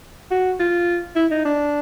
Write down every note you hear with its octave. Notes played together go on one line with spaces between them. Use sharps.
F#4
F4
E4
D#4
D4